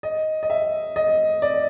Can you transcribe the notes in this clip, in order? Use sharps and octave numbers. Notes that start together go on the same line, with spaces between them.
D#5
D#5
E5
D#5
D5